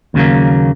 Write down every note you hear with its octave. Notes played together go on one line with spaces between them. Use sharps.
D#2 C#3 F#3 A#3